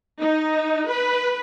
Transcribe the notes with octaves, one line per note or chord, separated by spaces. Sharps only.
D#4
B4